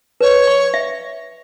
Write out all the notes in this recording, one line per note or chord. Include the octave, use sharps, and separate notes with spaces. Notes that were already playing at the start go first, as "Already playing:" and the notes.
B4 C#5
C#6
E5